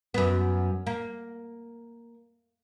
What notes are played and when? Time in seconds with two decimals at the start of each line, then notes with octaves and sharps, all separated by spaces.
0.14 F#2 B3
0.86 A#3